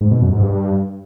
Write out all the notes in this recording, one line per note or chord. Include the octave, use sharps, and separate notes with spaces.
G#2
B2
F#2
G#2
G2